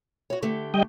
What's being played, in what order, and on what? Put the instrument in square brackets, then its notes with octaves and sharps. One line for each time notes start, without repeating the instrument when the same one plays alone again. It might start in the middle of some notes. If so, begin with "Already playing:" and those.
[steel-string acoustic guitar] F#4 C#5
D3 A3 G4
[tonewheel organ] G3 D#5 G5